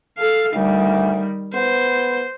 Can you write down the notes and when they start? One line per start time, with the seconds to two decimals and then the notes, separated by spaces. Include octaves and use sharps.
0.18 A4 F5
0.54 D2 D#3 G3
1.54 B3 C5